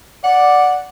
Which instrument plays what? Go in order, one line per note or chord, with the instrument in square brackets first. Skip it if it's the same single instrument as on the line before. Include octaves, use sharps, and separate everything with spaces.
[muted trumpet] D5 [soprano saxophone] F#5